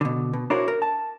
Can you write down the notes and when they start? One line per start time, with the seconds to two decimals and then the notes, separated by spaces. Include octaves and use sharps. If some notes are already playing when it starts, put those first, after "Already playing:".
0.01 B2 D3
0.33 B2
0.50 D4 E4 F#4 A#4 C5 C#5
0.68 A#4
0.82 A5